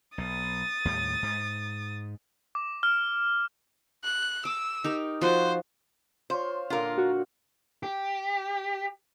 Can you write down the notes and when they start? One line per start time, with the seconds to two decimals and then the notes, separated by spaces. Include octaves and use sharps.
0.18 B1 D#6 A6
0.85 D#2 A2 G3
1.23 G#2
2.55 D6
2.83 F6
4.04 F#6
4.45 D6 E6
4.84 D#4 G4 A#4
5.21 F3 F#4 C5
6.30 F4 C5 C#5
6.70 A#2 D3 F4 A#4 F5
6.98 F#4
7.83 G4